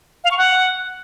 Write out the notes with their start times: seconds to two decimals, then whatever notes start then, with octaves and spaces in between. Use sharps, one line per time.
0.24 F5
0.31 C#6
0.38 F#5